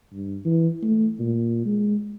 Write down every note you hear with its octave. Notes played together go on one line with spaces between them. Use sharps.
G2
E3
A3
A#2
G#3